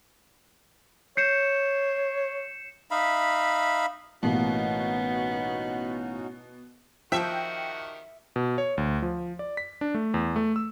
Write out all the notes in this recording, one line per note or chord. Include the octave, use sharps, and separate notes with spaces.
C#5 G6 C7 C#7 E7
D#4 E5 F5 B5
A1 B2 A#3 B3 C#4 D#4 F#4
D#3 F3 F#4 G4 E5 G5
B2
C#5
D2
F3
D5
B6
D4
A3
E2
A3
E6